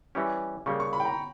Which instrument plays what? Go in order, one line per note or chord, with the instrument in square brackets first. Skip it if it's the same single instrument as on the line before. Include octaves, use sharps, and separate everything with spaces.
[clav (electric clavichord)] E3 G3 C#4 G4
[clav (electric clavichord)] C#3 G3 A#3 [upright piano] C#6
[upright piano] C#6
B5
G5
A#5